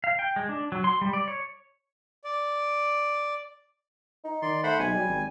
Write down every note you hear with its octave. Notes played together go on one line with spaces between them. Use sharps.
F5
G5
G#3
D4
F#3
C6
G3
D5
C#5
D5
D#4
D#3 D5 C6
A3 C5 F#5 B5
B1 G#3 G#5
F#3 G3
G#1